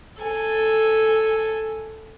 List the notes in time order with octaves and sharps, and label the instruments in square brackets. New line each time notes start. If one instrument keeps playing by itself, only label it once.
[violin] A4 G#5